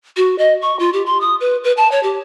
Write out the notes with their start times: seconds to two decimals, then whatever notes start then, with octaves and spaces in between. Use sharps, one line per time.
0.17 F#4
0.38 D#5
0.62 C#6
0.79 F4
0.93 G4
1.06 C6
1.21 D#6
1.40 B4
1.64 B4
1.77 A5
1.92 C#5
2.03 G4